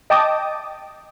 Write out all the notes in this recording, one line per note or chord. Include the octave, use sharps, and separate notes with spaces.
D#5 G5 A5 D6 D#6